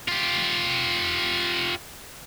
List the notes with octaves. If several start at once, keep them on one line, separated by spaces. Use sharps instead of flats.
F4 G4